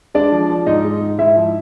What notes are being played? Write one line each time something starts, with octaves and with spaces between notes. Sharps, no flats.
G#3 D4 D5
F3
F3
G#2 D#4 D#5
G#3
G#2
G#2 E4 E5
F3